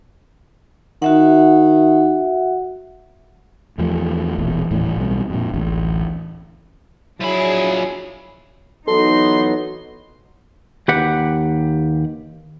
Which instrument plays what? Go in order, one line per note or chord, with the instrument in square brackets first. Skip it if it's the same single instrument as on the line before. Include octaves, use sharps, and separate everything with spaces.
[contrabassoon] D#3 [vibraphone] F#4 E5 F#5
[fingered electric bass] E2 F3 A3
E1 A#1 E2
D#1 A2 E3
B1 G3
F2 A#2
D1 A1
[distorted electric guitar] F3 B5 [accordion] F#3 [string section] D4 G#4 [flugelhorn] E4
[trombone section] E3 F#3 B3 [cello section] D#4 [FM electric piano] A4 [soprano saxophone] C6
[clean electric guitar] D#2 G4 B4 F#5